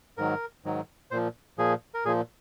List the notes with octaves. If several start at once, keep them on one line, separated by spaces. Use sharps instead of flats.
G#2 D#3 F#3 A#4
G#2 D#3 F#3
A#2 F3 C5
A#2 F3 G#4
A#4
A#2 F3 G#4